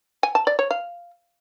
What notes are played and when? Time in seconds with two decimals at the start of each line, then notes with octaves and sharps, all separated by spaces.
0.23 G#5
0.35 A5
0.47 D5
0.59 C#5
0.71 F5